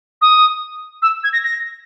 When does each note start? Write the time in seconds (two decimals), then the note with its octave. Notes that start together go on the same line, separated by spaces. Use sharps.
0.21 D#6
1.02 E6
1.24 G#6
1.33 A#6
1.44 A#6